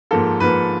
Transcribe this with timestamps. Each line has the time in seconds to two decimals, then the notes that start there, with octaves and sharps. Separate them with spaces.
0.11 G#2 F3 A#3 A4
0.40 G#2 F3 A#3 B4